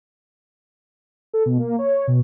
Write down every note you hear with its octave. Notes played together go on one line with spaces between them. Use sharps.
A4
B2
A#3
C#5
B2